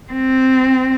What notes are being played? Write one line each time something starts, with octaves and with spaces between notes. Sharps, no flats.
C4